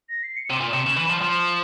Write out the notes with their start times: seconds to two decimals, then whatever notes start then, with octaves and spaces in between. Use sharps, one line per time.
0.09 A#6
0.23 C7
0.36 C#7
0.50 C3 E7
0.61 A#2
0.74 C3
0.86 C#3
0.97 E3
1.10 F3
1.22 F3 E7